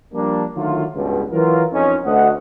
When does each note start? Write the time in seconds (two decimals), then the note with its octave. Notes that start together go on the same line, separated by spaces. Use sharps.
0.14 F3 G3 A#3 D4
0.55 D3 D#3 F#3 A3 F4
0.95 C#2 G2 B2
1.32 E3 F#3 F4 A#4
1.72 F2 C#4 D#4
2.05 D2 D#5 F#5